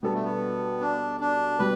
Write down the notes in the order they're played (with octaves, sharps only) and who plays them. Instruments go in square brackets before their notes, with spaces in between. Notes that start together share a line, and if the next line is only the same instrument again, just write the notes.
[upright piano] B2 G3 D4 A4 [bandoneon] B3
[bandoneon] A3
B3
D4
D4
[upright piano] B2 G3 [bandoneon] B4